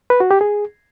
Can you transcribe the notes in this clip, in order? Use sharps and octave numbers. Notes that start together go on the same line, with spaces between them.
B4
F#4
G4
G#4